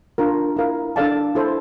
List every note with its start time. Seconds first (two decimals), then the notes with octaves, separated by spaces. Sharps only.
0.18 D4 F4 A#4
0.56 E4 A#4 F5
0.96 D4 A4 D5 F5 A5
1.35 E4 A4 C5